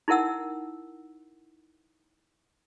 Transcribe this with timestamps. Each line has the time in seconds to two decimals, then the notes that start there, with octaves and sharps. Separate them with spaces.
0.08 D#4 E4 A#4 F#5 E6